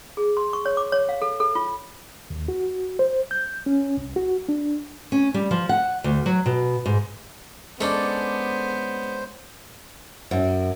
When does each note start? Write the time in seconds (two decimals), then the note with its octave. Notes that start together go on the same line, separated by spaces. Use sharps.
0.17 G#4
0.37 C6
0.53 C#6
0.66 C#5
0.77 D6
0.92 C#5
1.09 F5
1.22 A4
1.40 A4
1.55 F4
2.30 D#2
2.48 F#4
2.99 C5
3.31 G6
3.66 C#4
3.97 C2
4.16 F#4
4.49 D4
5.12 C#4
5.34 G3
5.51 F3
5.69 F#5
6.04 D2
6.26 F#3
6.46 B2
6.86 G#2
7.80 G#3 B3 C#4 D4 A4 C5 D5
10.31 F#2